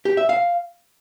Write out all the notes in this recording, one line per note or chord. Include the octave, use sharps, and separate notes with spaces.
G4
E5
F5